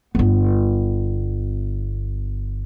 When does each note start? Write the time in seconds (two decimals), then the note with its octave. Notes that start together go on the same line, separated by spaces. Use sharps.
0.15 G1 B3